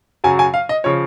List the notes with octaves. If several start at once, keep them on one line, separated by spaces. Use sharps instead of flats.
F#2 C#3 F#3 G#5
G#5
F5
D#5
C#3 F3 C#5